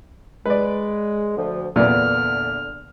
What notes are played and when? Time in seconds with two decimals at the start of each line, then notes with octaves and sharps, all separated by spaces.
0.46 G#3 B4 D5
1.37 D2 F3
1.76 E2 A#2 D3 B3 F6